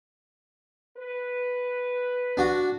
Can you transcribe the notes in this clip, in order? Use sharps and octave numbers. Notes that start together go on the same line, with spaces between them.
B4
D4 F#4